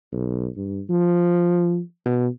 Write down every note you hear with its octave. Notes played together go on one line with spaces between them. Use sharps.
B1
G2
F3
B2